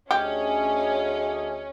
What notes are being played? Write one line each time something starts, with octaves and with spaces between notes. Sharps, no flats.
D2 C#4 G4 G#4 D#5